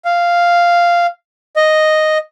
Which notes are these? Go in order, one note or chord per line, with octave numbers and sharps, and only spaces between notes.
F5
D#5